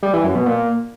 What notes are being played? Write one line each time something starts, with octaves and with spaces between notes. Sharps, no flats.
G3
E3
F#2
B2
A#2